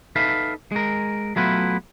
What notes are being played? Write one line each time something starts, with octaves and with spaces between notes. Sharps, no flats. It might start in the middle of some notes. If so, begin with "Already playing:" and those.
D#4 A4 B4 E5 F5
G#3 A#4
F#3 A3 B3 E4 F4 B4